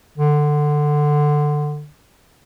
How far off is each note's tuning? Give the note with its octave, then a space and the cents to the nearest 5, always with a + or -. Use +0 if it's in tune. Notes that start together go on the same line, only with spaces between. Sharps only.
D3 +15